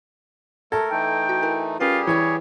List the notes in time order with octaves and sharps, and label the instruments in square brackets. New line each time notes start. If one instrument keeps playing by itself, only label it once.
[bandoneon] A3 A#4 [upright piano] A4 [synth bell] G#6 A#6
[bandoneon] E3 A3 D#4 [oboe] G5
[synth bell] F#4
E4 A#4 G#5
[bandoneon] G3 G4 G#4 [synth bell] C#4 A#4 B4 [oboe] F4
[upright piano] E3 [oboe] C#5 [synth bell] G5 G#5 B5